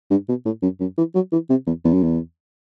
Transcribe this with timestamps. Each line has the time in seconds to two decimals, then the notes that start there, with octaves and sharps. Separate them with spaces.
0.10 G2
0.29 B2
0.45 A2
0.62 F#2
0.80 F#2
0.98 E3
1.15 F#3
1.32 E3
1.50 C3
1.67 E2
1.84 E2
1.93 F#2
2.03 E2